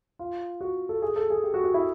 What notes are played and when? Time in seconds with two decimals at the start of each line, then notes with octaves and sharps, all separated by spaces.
0.19 F4
0.61 F#4
0.89 A4
1.02 G#4
1.16 A4
1.30 G#4
1.44 G4
1.54 F#4
1.64 F#4
1.74 E4